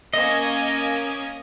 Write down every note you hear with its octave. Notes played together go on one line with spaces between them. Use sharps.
A#3 C#4 D#5 G#5